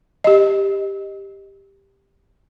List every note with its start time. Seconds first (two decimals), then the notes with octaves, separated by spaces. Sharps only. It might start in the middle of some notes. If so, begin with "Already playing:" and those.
0.24 G4 D#5